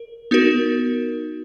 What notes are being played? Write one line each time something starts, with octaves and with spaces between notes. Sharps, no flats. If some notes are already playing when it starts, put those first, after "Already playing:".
Already playing: A#4
B3 D#4 F#4 A#4